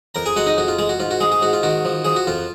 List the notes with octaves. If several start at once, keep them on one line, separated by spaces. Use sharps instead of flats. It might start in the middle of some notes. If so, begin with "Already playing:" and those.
F2 A#4 A#5
G#4 G#5
G#3 F#4 F#5
D#4 D#5
F2 F#4
F4
G#3 G#4
F#4
G#2 F4
F#4
G#3 G#4
G#4
G#2 F#4
F4
D#3 F#4
F3
F3 G#4
F#4
F2 F4